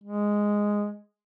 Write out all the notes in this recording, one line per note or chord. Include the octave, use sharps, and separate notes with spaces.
G#3